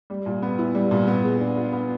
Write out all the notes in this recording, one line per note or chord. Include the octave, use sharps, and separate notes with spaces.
G3
A#2
B3
E4
G3
A#2
B3
G#3
D4
F4
B3